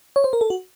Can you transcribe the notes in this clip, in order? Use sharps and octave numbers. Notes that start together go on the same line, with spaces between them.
C#5
C5
A#4
A4
F#4